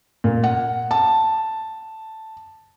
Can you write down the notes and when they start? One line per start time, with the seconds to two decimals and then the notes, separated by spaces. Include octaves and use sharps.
0.24 A#2
0.44 F#5
0.91 A5